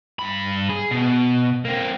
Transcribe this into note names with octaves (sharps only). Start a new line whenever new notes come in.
G2 B5
G#4
B2
A#3 C4